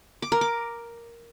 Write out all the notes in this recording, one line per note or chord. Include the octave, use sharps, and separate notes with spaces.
D6
A#4
D6